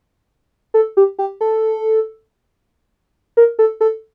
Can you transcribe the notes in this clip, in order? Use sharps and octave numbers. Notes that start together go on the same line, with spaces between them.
A4
G4
G4
A4
A#4
A4
A4